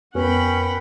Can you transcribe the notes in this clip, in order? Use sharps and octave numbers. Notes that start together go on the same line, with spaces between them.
F2 B3 C#4 A#4 F#5 G5 B5